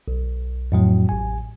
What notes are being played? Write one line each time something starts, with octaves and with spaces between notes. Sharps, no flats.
B1
F2 A2 F#3
A1 G#5